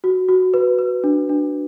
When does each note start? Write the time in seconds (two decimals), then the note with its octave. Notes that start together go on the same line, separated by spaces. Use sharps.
0.04 F#4
0.29 F#4
0.54 B4
0.79 B4
1.04 D4
1.29 D4